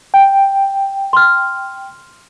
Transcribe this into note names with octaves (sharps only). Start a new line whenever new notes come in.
G5
C6 F6